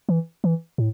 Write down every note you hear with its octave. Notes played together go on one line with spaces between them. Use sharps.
E3
E3
A2